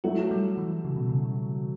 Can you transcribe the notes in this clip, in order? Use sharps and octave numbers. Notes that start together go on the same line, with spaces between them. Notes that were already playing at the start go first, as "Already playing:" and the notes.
F#3 A3 E4 F#4
G3
E3
C#3
B2
C#3